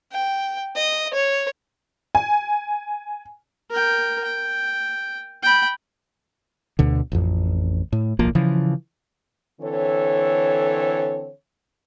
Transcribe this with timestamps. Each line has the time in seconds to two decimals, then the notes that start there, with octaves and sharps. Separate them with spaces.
0.12 G5
0.76 D#5
1.13 C#5
2.15 G#5
3.70 A#4 G5
4.24 G5
5.43 G5 B5
6.79 D2 B2 D3
7.12 A1 F2
7.92 A2
8.19 D1 B1 F3 A#3
8.35 C#3 E3 F3
9.61 D3 E3 C4 A4 C#5